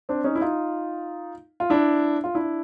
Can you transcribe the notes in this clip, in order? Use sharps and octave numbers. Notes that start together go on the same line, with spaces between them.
C4 D4
C#4 D#4
E4
D#4 F4
F4
D4 E4
F4
D4 E4